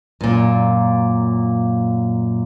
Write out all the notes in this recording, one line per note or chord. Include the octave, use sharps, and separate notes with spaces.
F#2 A#2